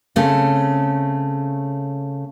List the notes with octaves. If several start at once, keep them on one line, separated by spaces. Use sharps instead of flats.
C#3 A3 C4